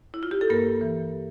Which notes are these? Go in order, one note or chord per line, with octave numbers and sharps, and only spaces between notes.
E4
F4
G4
A4
G2 A#3 A#4
E3